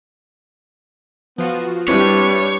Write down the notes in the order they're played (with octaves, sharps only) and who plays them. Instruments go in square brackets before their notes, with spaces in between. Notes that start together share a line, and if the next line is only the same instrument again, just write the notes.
[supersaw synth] F3 F4 F#4 [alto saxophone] B3
[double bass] G3 D4 [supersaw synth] C4 E4 G4 [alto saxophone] B4 [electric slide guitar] C#5